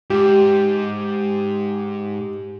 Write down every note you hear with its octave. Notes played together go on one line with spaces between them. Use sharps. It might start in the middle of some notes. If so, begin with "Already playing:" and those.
G#2 G4